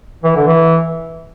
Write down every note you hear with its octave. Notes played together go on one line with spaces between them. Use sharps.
E3
D3
E3